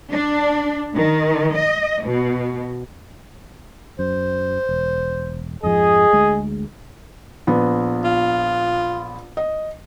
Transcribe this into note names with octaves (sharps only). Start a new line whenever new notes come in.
D4
D#3
D#5
B2
F#2 C5
E1
F2 G#2 F3 G#4 D#5
D2 G#3
A#1 B3
F4
D#5